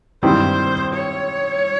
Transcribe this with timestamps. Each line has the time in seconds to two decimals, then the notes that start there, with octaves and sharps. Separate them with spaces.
0.23 G2 D#3 G3 C4 E4 C5
0.93 C#5